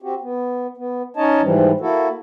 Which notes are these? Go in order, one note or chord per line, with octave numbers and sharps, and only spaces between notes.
C4 F#4 G4
B3
B3
C#4 D#4 C#5 D#5 A5
G#2 E3 F3 G3
A#3 E4 F#4 A4